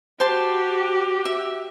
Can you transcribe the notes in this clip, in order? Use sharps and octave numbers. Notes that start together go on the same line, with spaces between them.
F#4 G4 C5 A5 C6
E5